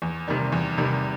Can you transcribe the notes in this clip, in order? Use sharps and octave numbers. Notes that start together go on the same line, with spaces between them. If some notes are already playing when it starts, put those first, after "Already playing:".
E2
C3 D#3 G3
E2
C3 D#3 G3